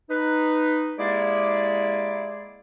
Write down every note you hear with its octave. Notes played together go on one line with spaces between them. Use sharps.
D#4 B4
G#3 A#3 E4 G4 G#4 D5